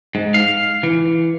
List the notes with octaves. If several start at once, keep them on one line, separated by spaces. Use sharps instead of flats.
G#2
F5
E3